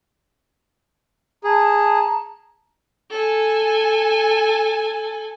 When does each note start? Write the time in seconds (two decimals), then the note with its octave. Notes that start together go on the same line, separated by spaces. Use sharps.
1.44 G#4 A5 A#5
3.11 A4 G#5